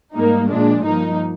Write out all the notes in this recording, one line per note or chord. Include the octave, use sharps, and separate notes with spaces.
G#2 G3 A#3 D#4
A#2 F3 G#3 D4
G2 F3 A#3 D#4